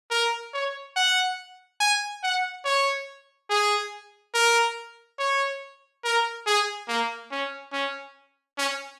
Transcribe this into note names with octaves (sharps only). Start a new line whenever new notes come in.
A#4
C#5
F#5
G#5
F#5
C#5
G#4
A#4
C#5
A#4
G#4
A#3
C#4
C#4
C#4